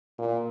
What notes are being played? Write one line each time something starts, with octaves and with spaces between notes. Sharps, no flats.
A#2